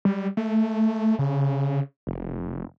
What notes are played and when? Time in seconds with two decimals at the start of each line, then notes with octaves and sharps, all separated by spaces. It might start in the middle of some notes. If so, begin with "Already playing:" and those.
0.05 G3
0.37 A3
1.19 C#3
2.07 F1